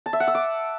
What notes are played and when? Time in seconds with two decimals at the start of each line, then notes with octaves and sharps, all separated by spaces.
0.06 A5
0.13 E5
0.20 F#5
0.27 E6
0.35 D6